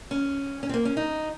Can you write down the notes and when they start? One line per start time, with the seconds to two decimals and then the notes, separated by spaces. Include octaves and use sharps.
0.11 C#4
0.63 C#4
0.69 C4
0.74 A#3
0.85 C#4
0.97 D#4